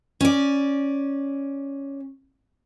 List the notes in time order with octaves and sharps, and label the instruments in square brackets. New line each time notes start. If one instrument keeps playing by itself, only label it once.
[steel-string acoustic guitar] C#4 D5